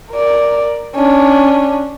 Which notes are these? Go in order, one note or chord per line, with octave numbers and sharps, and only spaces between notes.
A#4 D5
C#4 D4